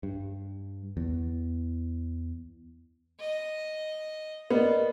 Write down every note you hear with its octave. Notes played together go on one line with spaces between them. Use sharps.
G2
E2
D#5
B3 A#4 D5 D#5